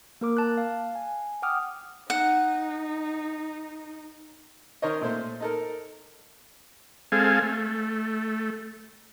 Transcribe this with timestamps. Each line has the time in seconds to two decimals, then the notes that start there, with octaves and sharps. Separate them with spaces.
0.21 A#3 A#4 D6
0.37 A5 F#6
0.58 F5
0.95 G#5
1.42 F#5 G5 D6 D#6 F6
2.10 D#4 F#5
4.82 D#3 A#4 C5 C#5 D#5
5.01 A#2 A3 C5
5.40 D#4 A4 A#4
7.12 G#3 C4 A4 F5 G#5
7.42 A3